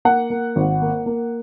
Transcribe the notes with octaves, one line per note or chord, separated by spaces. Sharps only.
A#3 F#5
A#3
G#1
A#3
A#3